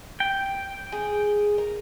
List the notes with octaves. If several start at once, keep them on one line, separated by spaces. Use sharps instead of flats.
G5
G#4
A#4